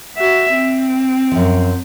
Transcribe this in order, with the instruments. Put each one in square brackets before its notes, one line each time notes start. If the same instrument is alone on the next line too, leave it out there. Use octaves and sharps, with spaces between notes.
[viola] F#4 E5
C4
[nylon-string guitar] F#2 F3